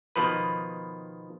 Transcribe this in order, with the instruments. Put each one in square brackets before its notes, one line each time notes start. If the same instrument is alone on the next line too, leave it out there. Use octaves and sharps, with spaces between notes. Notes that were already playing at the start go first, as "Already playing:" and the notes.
[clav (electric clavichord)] B2 D#3 F3 B4